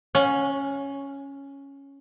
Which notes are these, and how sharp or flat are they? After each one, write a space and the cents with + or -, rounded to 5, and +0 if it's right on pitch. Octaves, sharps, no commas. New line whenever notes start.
C#4 +0 F#5 -45